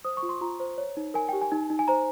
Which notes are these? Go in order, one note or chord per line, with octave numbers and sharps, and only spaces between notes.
C5 D#6
C#6
F4
C6
F4 A#5
C5
C#5
D#4
A#4 G#5
G4 G5
G#5
D#4
D#4
G#5
C5 A#5